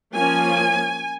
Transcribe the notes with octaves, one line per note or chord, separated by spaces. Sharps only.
F3 A#3 C#4 G#5